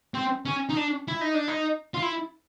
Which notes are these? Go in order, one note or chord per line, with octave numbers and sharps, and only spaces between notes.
C4
C#4
D#4
D4
E4
D#4
D4
D#4
F4
E4